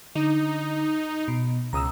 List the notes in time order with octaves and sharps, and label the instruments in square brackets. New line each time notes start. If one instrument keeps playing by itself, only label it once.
[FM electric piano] D3 [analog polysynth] D#4
[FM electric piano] B2
[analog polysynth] C#2 [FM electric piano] A#5 D#6 E6